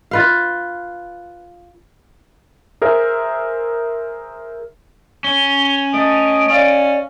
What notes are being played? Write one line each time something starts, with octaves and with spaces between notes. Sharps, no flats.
F4 B4 F5
G#4 A#4 C5 E5
C#4 G7
A3 D#5 D7
C#4 D5 D#5 F5